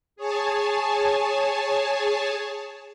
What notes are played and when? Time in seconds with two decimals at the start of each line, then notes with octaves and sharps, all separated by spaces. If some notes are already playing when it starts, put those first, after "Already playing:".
0.16 G#4 C#5 G#5 A5